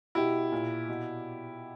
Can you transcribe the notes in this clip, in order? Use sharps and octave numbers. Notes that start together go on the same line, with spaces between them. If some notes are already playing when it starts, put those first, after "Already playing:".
B2 E4 G4
A#2
B2